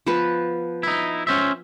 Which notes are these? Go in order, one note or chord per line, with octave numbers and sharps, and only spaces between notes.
F3 B3 B4
D#4 E4
C#4 C5 E5